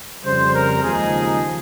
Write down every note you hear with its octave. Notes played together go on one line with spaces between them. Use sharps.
F2 C#3 G3 C5
A#4
D#2 C#3 F3 G#3 D#4 G#4